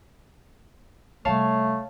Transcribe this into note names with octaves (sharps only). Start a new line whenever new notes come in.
C3 G3 A3 C#5 F5 A5